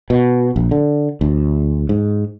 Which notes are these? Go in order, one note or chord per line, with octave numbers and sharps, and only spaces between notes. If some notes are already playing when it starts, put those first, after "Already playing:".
B2
A#1
D3
D2
G#2